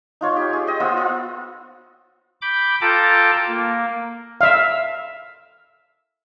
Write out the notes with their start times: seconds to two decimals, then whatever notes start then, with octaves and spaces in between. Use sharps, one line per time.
0.21 D#4 F4 C#5
0.36 G4
0.53 G#4
0.67 D#5 G5
0.80 B3 F4 C5 E6
0.97 F4
2.41 B5 D6 G6
2.81 F4 A4 G5 A5 A#5 D6
3.48 A#3
4.41 E5 F5